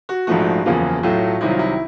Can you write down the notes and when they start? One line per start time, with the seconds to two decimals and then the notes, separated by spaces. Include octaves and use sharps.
0.09 F#4
0.27 A#1 G#2 F3 A3 F#4
0.66 F#1 E2 C#3 F3 A#3 F4
1.03 B1 A2 F#3 A3 F4
1.41 C2 C3 D#3 F#3 E4
1.50 F4
1.59 E4